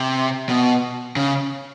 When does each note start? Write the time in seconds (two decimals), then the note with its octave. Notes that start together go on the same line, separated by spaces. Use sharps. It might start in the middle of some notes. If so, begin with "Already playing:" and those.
Already playing: C3
0.49 B2
1.16 C#3